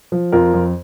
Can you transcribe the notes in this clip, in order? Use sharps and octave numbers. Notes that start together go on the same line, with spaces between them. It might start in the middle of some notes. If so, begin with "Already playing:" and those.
F3
F2 F4 A#4
F2